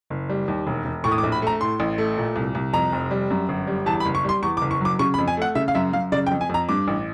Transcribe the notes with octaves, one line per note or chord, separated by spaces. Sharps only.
F#1
G3
D#2
E1
E1
A2 C#6
D#6
D6
A#1
B5
A3 A#5
A2 C6
A1
A3
A#2
C2
C2
F2 A#5
F1
G3
F#2
G1
G3
E2 A5
B5
F#1
C#6
G3 C6
E2 C#6
D6
F#1
C#6
F#3 D6
C#3 C#6
B5
F2
G#5
A3 F#5
C#3 E5
F5
F#2 E5
F#2 F5
C#3 D5
G5
F2
G#5
F2 A#5
G2 D6
A1